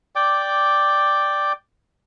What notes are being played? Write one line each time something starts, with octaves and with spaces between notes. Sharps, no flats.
D5 G5 D6